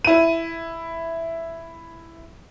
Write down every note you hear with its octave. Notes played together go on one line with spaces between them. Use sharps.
E4 D#7